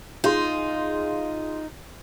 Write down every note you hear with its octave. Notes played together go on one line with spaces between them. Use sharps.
D#4 F4 G#4 C6